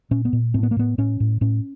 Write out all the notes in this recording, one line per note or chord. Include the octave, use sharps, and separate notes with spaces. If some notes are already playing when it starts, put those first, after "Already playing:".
A#2 C#4
B3
A#2
A2 C4
B3
A#3
A2 B3
A2 C#4
A2
A2 C#4